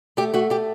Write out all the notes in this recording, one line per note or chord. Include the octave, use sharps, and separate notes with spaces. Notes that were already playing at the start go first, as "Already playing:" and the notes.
A3 G4
A3 F#4
A3 G4